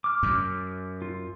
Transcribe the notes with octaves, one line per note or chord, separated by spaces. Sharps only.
D6 F6
F#2
F4